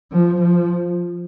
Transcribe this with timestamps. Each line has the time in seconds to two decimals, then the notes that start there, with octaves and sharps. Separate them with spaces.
0.12 F3
0.42 F3